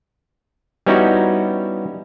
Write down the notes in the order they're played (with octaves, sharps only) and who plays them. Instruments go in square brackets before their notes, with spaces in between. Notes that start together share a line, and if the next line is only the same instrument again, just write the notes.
[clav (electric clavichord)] G3 B3 C#4 D#4 E4 F#4